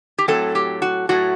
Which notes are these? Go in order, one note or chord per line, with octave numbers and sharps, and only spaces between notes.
G4
A2 F#3 A3 C4 A4
G4
F#4
A2 F#3 A3 F#4